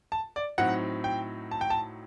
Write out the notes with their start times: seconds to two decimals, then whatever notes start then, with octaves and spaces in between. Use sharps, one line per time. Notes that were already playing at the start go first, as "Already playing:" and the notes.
0.12 A5
0.36 D5
0.58 A2 F#3 C4 D#4 F#5
1.04 G5
1.51 A5
1.61 G5
1.70 A5